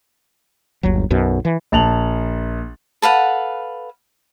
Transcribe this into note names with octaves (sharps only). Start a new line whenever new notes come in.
G1 D#2 F#3
B1 F#2 B2
E3
A#1 A5 F7 F#7
A4 B4 F5 F#5